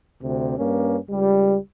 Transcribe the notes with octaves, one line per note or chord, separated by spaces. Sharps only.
D2 C3
G2 A#3 C#4
C#2 G3